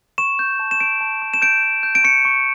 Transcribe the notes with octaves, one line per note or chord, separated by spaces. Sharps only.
C#6 E7
G6
A5
E7
A5 D7
A5
C#6
E7
G6 D7
G6
G6
D7
C#6 C#7
C#6